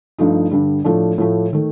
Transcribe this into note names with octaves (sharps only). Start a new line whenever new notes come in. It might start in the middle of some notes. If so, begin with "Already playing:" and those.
G2 F3 A3 D#4
G2 D3 G3
A2 F3 A3 D4
A2 F3 A3
D#3 A3